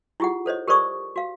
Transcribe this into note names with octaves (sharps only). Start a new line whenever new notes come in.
E4 F4 G4 G#4 F#5
A4 C5 C#5 D#5
G4 A#4 C5 D5 C#6 D#6
F#4 F5